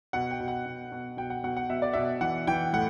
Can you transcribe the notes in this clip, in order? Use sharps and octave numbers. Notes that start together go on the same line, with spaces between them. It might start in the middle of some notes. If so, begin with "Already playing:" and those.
B2 F#5
G5
B2
F#5
B2
B2
B2 G5
F#5
B2 F#5
F#5
B2 E5
D5
B2 E5
E3 F#5
E3 G5
A2 F#5